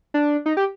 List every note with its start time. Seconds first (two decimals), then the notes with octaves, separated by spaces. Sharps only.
0.14 D4
0.46 D#4
0.57 G4